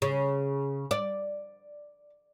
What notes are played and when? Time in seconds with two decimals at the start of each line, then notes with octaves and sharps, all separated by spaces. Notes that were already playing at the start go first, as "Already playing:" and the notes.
0.02 C#3
0.91 D5